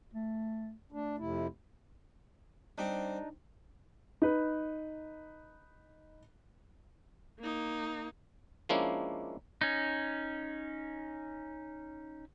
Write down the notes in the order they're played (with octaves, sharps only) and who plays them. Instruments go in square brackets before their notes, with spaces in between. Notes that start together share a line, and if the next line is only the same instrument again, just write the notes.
[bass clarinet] A3
[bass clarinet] A3 [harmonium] D4
[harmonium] F2 C3 E4
[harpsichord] G3 C4 [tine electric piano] D4 D#4
[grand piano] D#4 B4
[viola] A#3 D#4
[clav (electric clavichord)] F3 G#3 A#3 C#4 D4 E4
[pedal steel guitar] C#4 D#4